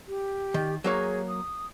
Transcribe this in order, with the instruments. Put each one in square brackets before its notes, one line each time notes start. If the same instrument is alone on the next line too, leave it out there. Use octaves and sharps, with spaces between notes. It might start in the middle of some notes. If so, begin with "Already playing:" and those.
[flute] G4
[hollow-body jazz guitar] D#3
[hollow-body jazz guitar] F#3 A#3 C#5 [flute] G#4
[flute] D#6